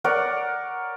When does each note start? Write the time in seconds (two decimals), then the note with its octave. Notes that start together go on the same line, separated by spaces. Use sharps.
0.04 A#4 C#5 D5 F#5